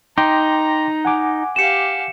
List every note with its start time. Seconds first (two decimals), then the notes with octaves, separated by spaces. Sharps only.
0.18 D#4 G5 A#5 C6 D6
1.05 F#5 G#5 D6
1.56 G4 F5 C#7 E7